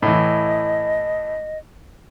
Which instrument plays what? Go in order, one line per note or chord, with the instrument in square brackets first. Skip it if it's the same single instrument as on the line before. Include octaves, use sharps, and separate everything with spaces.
[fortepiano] A2 E3 [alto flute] D#5